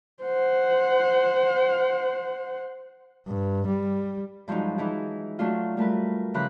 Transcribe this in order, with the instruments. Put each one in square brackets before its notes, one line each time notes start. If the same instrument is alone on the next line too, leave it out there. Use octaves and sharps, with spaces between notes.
[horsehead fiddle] C5 F#5
[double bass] G2
G3
[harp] G2 F3 F#3 G#3 D#4
E3 D#4 E4 G#4
F#3 A3 D4 F4
G3 A3 A#4 B4
C#3 E3 F3 A#5 B5 F#6